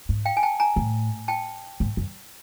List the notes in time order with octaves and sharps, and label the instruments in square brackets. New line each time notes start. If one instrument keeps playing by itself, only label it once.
[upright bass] G#2
[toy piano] F5 G5
G#5
G5 A5
G#5 A#5
[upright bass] A2
[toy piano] G5 A5
[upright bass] G#2
F#2